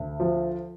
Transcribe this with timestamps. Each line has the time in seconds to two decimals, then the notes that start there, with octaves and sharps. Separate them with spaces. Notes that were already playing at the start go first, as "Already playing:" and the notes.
Already playing: D2
0.20 F3